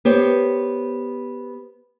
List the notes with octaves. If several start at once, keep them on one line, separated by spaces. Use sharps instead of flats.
B3 G4 C5 C#5